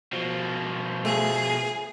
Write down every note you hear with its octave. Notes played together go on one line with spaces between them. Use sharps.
B2 F3
A3 G#4